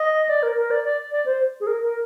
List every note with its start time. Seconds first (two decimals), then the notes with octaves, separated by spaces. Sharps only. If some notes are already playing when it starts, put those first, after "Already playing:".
Already playing: D#5
0.28 D5
0.42 A#4
0.56 A#4
0.70 D5
0.84 D5
1.11 D5
1.25 C5
1.60 G#4
1.66 A#4
1.82 A#4